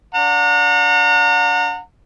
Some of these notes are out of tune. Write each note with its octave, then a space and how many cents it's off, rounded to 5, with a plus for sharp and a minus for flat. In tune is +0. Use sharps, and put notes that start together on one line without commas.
D4 -25 F#5 -35 A#5 -35